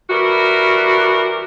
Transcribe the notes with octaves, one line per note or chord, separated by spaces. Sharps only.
E3 G3 F#4 A#4